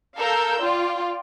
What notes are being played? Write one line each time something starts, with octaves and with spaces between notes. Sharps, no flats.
A4 A#4 F5 E6 G6
F4 D5 G5